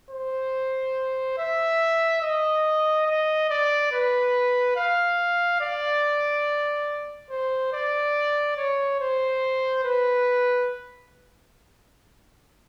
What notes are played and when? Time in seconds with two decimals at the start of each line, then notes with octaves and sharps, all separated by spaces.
0.10 C5
1.38 E5
2.22 D#5
3.07 D#5
3.49 D5
3.92 B4
4.76 F5
5.61 D5
7.30 C5
7.73 D5
8.57 C#5
9.00 C5
9.84 B4